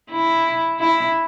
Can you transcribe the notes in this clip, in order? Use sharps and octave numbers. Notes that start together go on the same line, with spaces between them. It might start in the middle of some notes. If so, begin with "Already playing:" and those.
E4
E4